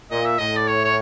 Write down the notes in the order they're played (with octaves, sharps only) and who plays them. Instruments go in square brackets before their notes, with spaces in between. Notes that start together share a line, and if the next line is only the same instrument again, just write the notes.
[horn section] A#2 [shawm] D#5
[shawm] E5
[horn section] A2 [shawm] D#5
[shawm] D5
C#5
C#5